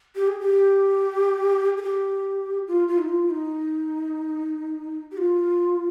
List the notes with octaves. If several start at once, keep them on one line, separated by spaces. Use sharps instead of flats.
G4
G#4
G4
G#4
G4
F4
F4
D#4
F4
D#4
G4
F4